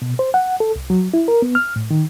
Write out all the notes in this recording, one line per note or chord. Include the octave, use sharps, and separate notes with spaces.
B2
C5
F#5
A4
C2
F#3
E4
A#4
B3
F6
A2
D#3